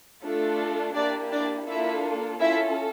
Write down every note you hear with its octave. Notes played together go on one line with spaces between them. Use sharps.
A3 D4 F4 A4
A#3 D4 E4 G4 D5
D4 D5
A#3 D4 E4 F4 A4 E5
C#4 E4 F4 A4 E5